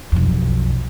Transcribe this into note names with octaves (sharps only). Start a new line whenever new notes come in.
B1 F2